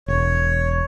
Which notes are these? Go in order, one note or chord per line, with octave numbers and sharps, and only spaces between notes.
E1 C#5